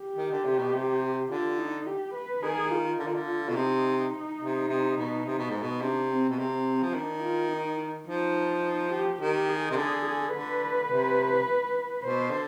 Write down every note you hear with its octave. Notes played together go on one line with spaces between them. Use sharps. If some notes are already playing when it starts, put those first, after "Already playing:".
Already playing: G4
D#3
D3
C3
B2
C3
D3 F4
D#4
G4
B4
D#3 G#4
F4
D3
D#3
D3
B2
C3 D#4
C3
C3
B2
C3
B2
G#2
B2
C3 D4
C4
B2
C3 C4
F3
D#3 D4
F4
D#4
F3 D#4
D#4
G4
D#3 G4
G#4
C3
D3 G#4
G#4
D3 B4
C3
B2 C5
D3